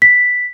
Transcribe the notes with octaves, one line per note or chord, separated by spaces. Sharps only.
B6